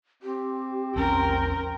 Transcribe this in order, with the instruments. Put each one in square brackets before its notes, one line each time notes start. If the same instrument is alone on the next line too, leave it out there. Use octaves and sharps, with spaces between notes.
[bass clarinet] C4 [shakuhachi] G4
[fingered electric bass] A#1 E2 F3 [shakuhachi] C#4 [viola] A#4 G5